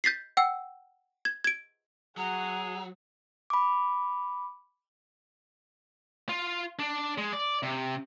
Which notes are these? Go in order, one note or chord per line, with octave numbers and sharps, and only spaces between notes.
G6 A6 B6 C7
F#5 G5 E6
G#6
G#6 D7
F#3 G#4 F#5 A#5
B5 D6
F4
D4
G#3
D5
C3